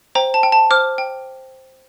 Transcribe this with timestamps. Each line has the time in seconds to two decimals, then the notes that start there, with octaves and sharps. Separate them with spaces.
0.15 C5 G5 A#5
0.34 A5
0.43 G5
0.52 A5
0.71 C5 D6 F6
0.98 G5